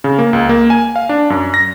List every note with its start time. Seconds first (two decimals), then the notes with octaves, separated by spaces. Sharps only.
0.04 C#3
0.18 A#3
0.33 C#2
0.49 A#3
0.70 G#5
0.96 F5
1.09 D4
1.30 F#2
1.54 A#6